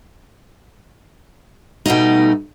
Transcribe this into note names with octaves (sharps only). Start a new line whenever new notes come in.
B2 G3 A3 D#4